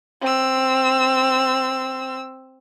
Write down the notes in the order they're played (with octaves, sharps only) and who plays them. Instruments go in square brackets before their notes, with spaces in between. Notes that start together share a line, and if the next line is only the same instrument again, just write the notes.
[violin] C4 E6